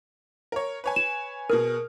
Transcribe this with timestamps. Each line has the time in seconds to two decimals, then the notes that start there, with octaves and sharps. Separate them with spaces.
0.52 A#4 C#5
0.84 B4 C#5 G#5
0.96 E7
1.50 B2 G#4 A#4 F6